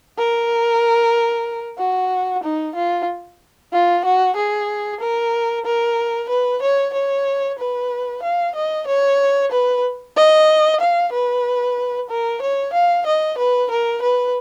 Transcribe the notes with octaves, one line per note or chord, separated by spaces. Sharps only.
A#4
F#4
D#4
F4
F4
F#4
G#4
A#4
A#4
B4
C#5
C#5
B4
F5
D#5
C#5
B4
D#5
F5
B4
A#4
C#5
F5
D#5
B4
A#4
B4